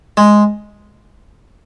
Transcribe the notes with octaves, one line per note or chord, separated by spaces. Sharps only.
G#3